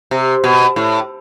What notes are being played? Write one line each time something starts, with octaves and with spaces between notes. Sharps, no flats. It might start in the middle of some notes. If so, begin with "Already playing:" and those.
C3
B2
A2